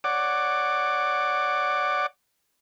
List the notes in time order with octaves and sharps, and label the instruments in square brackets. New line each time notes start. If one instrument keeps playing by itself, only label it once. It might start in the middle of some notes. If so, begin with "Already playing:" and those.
[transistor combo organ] C#5 D5 F#5 D6